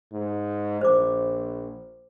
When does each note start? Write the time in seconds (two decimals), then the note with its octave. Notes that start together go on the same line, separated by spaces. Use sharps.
0.12 G#2
0.81 A#1 C5 D6